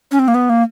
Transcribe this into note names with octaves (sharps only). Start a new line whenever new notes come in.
C#4
C4
A#3
B3
A#3